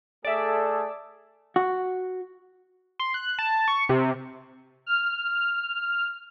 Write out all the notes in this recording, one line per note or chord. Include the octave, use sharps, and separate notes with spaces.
A3 G#4 A4 D5 E5
F#4
C6
F#6
A5
C#6
C3
F6